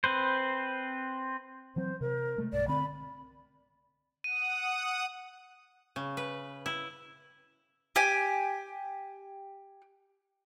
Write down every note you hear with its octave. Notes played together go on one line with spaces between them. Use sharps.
C4 B4 C5
E3 F#3 C4 C5
C3 A#4
C3 G#3 A3
B1 G2 D5
D3 C4 B5
F#5 D#6 D#7
C#3
B4
E4
G4 G#5